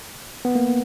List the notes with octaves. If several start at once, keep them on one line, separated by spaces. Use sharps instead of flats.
B3
A#3